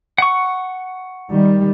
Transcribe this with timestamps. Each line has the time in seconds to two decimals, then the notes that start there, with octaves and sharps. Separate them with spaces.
0.18 F#5 C#6
1.31 D#3 G3